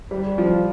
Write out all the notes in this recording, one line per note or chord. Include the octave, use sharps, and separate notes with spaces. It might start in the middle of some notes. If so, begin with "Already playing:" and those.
G3
F3